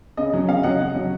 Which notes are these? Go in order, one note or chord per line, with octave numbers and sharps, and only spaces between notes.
C#3 D#5
F#3 C#4
C#3 F5
F#3 C#4 D#5 F#5
C#3
F#3 C#4